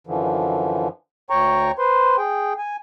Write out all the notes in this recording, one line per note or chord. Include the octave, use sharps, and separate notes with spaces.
F#2 D3 E3 F3
D2 C#5 G5 A#5 C#6
B4 C5 C6
G#4 G5
G#5